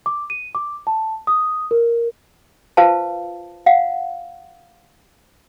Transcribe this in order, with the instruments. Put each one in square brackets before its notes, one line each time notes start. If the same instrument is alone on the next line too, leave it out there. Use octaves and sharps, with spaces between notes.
[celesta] D6
D#7
D6
A5
D#6
A#4
[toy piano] F4 B4 C5 F5 A5
F5 F#5